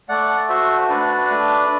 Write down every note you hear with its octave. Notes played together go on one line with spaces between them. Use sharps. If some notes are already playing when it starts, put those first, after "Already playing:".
A3 D5 F#5
F#4 C5 E5
D4 B4 D5
A3